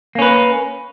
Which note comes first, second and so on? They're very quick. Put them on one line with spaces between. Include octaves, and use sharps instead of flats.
A#3 C#4 B4